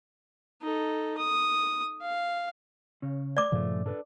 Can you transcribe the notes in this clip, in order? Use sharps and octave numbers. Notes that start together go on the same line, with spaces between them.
D#4 A4
D#6
F5
C#3 C#4
D5 D6
G2 A#2 C#3 F3 A3
D4 A4 B4